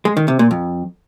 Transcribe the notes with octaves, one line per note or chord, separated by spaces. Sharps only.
G#3
D#3
C3
A#2
F2